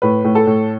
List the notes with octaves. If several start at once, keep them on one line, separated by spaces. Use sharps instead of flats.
A2 B4
A2
A4
A2